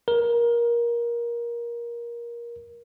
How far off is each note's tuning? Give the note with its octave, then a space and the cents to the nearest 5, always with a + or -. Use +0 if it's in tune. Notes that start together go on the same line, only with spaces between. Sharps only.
A#4 +20